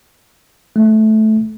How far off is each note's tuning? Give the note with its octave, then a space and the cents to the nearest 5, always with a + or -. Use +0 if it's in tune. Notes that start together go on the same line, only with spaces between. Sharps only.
A3 -15